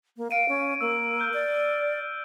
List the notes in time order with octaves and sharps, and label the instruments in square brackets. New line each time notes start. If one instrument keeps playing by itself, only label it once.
[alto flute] A#3
[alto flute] F5 [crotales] D7 D#7
[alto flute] C#4
[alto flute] A#3 [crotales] E6
[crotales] F6 G6
[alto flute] D5